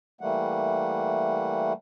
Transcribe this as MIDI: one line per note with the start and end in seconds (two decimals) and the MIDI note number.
0.21 1.73 52
0.21 1.73 55
0.21 1.73 57
0.21 1.73 58
0.21 1.73 78